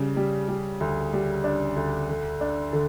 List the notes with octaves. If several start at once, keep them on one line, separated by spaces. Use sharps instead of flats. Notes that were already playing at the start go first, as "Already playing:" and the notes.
Already playing: C#3 G3
G3
G3
D2
G3
D4
D2
D3
D4
D3